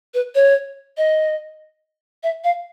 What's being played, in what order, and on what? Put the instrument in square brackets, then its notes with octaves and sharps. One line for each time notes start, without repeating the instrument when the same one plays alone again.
[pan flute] B4
C#5
D#5
E5
F5